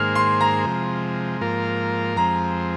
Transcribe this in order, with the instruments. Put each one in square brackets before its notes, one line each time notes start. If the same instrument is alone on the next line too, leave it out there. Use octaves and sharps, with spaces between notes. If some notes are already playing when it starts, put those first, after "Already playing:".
Already playing: [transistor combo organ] G#2 D#3 A#3 G#4 C5 [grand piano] F6
[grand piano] C6
A#5
[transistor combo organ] C3 F3 G#3
G#2 F3 A#3 F4 A#4
[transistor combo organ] F2 F3 G#3 C4 [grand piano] A#5